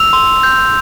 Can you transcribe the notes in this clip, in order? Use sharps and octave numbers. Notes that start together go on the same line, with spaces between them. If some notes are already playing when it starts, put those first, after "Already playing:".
Already playing: E6 F7
C6
G6